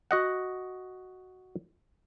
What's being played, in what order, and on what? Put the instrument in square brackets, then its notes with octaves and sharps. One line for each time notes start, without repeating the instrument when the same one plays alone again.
[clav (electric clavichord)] F#4 D#5 F#5